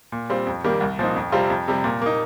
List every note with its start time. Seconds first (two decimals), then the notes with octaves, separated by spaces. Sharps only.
0.12 A#2
0.30 G3 C4 F4
0.47 F2
0.64 D#3 G3 A#3
0.80 C2
0.99 A#2 F3 C4 D#4
1.16 F2
1.32 C3 G3 C4 F4
1.50 F2
1.68 C3 G3
1.84 A#2
2.02 A#3 D#4